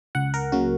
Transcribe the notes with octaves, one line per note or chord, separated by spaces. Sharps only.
C#2 F#5
A#4
C#3 F#3 A#3 F#4